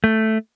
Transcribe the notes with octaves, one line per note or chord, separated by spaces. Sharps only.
A3